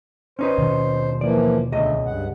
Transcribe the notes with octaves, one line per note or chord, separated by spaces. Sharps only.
C#4 D#4 B4 C5
D#2 B2 D#3
E3 F3 A#3 D5
C#2 D3 A3 D#5
G2 F#5